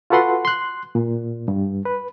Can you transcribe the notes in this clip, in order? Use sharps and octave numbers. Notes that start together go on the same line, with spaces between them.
F4 F#4 A4 B4 F#5 C6
C6 F#6
A#2
G2
B4